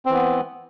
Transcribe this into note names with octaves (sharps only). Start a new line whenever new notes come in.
E3 B3 C4